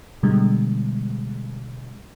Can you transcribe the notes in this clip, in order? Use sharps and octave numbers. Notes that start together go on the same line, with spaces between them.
B2 D3 G3 G#3